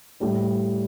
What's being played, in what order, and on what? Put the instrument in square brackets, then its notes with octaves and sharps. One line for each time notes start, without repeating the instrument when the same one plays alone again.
[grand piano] A2 G3 D4